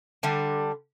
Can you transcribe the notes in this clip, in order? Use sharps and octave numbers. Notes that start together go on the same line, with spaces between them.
D3 G3 D4